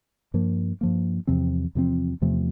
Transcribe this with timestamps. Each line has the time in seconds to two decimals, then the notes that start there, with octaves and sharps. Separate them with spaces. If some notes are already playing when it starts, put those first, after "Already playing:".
0.34 G2 F3 A#3
0.81 G2 F3 A#3
1.27 E2 C3 F3 C4
1.75 E2 C3 F3 C4
2.21 E2 C3 F3 A3